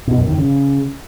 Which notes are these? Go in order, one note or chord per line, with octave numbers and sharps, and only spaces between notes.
B2
F#2
D#3
C#3